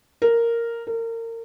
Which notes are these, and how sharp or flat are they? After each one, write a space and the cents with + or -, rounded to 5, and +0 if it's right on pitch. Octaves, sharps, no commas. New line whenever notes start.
A#4 -5
A#4 -30